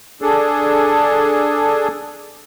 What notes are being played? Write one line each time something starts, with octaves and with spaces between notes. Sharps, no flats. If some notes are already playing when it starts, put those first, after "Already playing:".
D4 G#4 A4